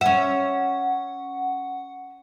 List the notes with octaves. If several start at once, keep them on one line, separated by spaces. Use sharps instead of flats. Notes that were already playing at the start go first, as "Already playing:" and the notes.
C#4 E5 F#5